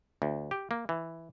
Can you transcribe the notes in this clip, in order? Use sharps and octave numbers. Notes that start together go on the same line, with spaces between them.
D2
G4
A#3
E3